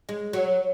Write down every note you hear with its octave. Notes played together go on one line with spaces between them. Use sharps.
G#3
F#3